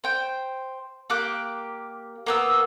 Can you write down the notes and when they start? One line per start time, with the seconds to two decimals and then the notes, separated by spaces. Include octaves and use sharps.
0.04 C5 G5
1.10 A#3 G4 D6 F#6
2.26 A#3 B3 E6